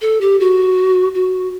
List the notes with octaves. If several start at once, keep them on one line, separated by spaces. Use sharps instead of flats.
A4
G4
F#4
F#4